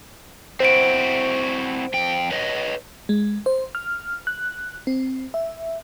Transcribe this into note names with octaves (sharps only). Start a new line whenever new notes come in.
C4 E4 F#4 C5 D7
F2 G5
B4 C#5 D#5
G#3
C5
F6
F#6
C4
E5